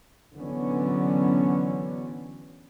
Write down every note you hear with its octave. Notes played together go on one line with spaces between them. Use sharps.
D3 E3 F#3 B3 C#4